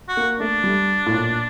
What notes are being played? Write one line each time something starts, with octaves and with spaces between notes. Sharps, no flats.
F#4
A#3
A3 D4
G3
A2
A#2